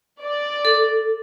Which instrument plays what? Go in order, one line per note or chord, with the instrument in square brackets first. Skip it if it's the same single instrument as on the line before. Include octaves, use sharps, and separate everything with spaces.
[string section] D5
[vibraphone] A4